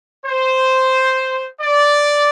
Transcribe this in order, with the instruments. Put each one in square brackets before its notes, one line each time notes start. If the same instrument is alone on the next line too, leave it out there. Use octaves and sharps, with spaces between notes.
[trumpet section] C5
D5